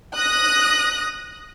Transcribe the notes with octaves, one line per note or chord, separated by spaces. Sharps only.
D#6 F#6 A#6